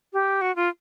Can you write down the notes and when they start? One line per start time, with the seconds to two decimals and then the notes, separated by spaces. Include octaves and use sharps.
0.13 G4
0.41 F#4
0.56 F4